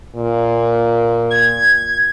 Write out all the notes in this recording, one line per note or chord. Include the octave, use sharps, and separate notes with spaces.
A#2
G#6